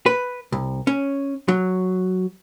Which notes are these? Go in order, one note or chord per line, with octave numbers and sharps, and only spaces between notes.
B4
C2
C#4
F#3